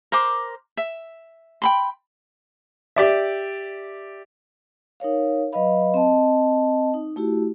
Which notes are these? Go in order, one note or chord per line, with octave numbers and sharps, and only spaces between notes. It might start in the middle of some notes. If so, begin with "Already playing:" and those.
A#4 C5 C6 D6
E5
G5 B5 C6
G4 D5 E5
D#4 A#4 C#5 F5
F#3 B4 D#5 F5 B5
C4 D#5 A5
D#4
A3 E4 F#4 G4